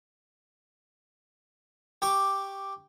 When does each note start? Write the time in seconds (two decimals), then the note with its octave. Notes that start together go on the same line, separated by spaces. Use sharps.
2.02 G4 C#6 D6